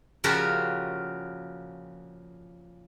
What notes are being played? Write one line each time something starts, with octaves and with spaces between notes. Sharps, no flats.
A#2 C#3 F3 F#4 G4 A#4